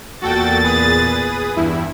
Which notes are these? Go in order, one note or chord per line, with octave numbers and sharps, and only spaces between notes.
E2 A#2 F#4 A4 G5 A6
G#4 B4 D#6
E2 G2 E4